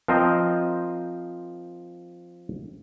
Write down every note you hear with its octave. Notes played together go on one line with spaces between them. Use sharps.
F3 C4 A#4 C5 D#5